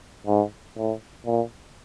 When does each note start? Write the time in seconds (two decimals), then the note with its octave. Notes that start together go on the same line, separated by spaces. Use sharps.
0.27 G#2
0.77 A2
1.26 A#2